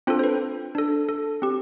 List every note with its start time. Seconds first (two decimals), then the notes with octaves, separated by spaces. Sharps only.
0.07 C4 D4 F4 A4 C5
0.19 C5
0.23 B4
0.75 D4 A4
1.09 A4
1.42 C4 G4